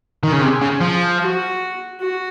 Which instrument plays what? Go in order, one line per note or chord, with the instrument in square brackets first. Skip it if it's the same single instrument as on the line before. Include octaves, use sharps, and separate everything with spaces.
[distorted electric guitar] D#3
C#3
[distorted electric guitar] C3 [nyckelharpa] G#4
[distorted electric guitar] C#3
F3
[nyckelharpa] F#4
F#4